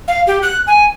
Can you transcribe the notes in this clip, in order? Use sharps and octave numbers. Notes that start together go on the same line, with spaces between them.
F5
G4
F#6
G#5